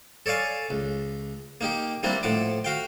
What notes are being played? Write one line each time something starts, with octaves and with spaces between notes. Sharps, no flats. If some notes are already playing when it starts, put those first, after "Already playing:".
A4 C#5 D5 F5 G#5
C#2
A#3 D#4 G4
G3 A#3 C4 D4 E4
A2 F3 F#5 D6
F#4 F5 G5